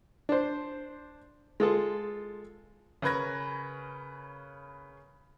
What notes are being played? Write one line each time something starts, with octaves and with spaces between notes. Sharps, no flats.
D4 C5
G#3 F4 A4
C#3 C#4 A#4 B4 G#6 A#6